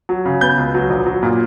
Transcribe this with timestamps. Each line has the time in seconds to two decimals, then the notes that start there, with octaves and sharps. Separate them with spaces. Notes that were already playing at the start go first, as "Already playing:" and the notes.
0.09 F#3
0.25 C#3
0.41 B3 G6
0.58 C#2
0.74 F#3
0.90 A#1
1.06 F#3
1.23 A#2